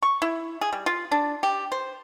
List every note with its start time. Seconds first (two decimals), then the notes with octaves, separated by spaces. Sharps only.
0.02 C#6
0.22 E4
0.61 G#4
0.73 G3
0.86 F4
1.11 D4
1.43 G4
1.72 C5